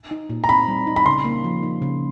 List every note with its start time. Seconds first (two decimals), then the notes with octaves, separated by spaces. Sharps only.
0.11 D#4
0.30 A#2
0.44 A#5
0.49 C4 B5
0.68 G3
0.87 D#4
0.96 B5
1.06 C#3 C6
1.24 A#3
1.44 F3
1.63 D#4
1.82 C#3